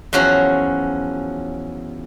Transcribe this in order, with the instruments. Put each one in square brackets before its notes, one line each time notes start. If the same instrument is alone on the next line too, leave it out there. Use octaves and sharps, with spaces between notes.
[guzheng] E2 F3 F#3 C#4 F#4